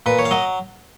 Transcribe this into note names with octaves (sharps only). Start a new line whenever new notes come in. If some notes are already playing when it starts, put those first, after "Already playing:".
A#2 B4
C#5
F5
F#3 D#5